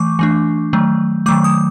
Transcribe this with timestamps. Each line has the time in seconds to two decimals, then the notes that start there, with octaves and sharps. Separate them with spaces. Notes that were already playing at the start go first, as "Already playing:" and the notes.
Already playing: E3 A3 C#6 D6
0.19 E3 A3 D4
0.73 D#3 F#3 A3
1.26 D#3 F#3 A3 D6
1.44 D#6